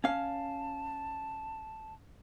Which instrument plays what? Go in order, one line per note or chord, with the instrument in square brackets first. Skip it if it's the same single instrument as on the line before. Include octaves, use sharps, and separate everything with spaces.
[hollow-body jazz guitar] C#4 F5 [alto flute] A5